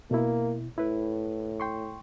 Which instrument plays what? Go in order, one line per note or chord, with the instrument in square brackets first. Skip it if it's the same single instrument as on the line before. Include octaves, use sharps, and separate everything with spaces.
[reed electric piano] B2 E4 [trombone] A#3
[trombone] A2 [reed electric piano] E4 B4
[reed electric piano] G5 C6 C#6